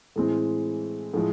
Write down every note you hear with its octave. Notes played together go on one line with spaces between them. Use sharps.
A2 E3 G#3 C4
A2 F3 G#3